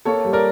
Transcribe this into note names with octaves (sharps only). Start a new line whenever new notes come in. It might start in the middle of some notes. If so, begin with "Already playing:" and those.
A#3 A4 C#5
G3
A#4 D5